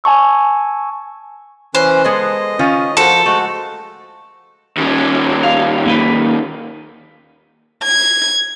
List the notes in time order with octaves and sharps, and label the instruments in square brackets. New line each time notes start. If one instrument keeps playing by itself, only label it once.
[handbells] G#5 A5 C#6 E6
[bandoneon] E3 C#4 B4 [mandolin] C5
[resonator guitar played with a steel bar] G#3 B3 A4 [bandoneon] D#5
[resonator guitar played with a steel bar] D#3 C#4 F4
[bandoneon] F3 C5 [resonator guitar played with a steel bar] F#4 A#4 [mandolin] A4
[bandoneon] G#3 F#4 [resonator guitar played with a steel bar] A3
[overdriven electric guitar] D#2 C#4
[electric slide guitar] F5
A#3 D#4 B4
[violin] G#6